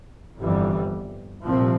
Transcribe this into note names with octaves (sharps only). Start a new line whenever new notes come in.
G1 F2 E3 G3
C2 A#2 F3 C4